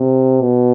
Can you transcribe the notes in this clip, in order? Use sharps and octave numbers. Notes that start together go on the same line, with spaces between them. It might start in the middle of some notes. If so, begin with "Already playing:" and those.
Already playing: C3
B2